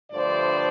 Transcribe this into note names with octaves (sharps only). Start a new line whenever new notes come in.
G2 D3 F3 A3 C5 D5